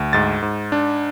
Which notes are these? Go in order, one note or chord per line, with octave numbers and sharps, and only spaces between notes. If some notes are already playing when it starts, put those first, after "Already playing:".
Already playing: D2
G#2 A6
G#2
D4